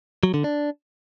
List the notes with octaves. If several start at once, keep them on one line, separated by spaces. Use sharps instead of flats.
F#3
D3
D4